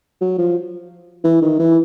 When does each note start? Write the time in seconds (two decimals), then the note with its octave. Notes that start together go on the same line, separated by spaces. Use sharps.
0.21 F#3
0.38 F3
1.24 E3
1.42 D#3
1.59 E3